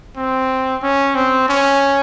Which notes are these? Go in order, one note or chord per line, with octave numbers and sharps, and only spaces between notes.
C4
C#4
C4
C#4